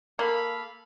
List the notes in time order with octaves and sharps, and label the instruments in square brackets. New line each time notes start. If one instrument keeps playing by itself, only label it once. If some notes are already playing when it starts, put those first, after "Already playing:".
[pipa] A#3 [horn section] A4 F5 B5